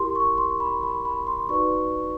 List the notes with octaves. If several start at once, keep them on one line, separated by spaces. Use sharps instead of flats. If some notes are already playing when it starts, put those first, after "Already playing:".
Already playing: E4 G4 A#4 C6
C#6
C6
B5
B5
B5
C6
D#4 F#4 B4 D5 C#6